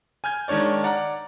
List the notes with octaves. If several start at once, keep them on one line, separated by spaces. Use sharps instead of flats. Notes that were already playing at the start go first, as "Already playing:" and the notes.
G#5 F6 G6 G#6
D#3 G#3 D4 C#5 D5
D5 F#5 A#5